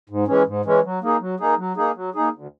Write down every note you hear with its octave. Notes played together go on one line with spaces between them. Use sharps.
G#2
E3 G#3 C#4
G#2
E3 G#3 C#4
F#3
A#3 D#4 G#4
F#3
A#3 D#4 G#4
F#3
A#3 D#4 G#4
F#3
A#3 D#4 G#4
D2